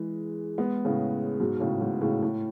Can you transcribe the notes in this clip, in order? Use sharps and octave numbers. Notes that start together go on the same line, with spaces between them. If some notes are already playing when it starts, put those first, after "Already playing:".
Already playing: E3 G#3
G#3 B3
A2 C#3
G#2 B2
A2 C#3
G#2 B2
A2 C#3
A2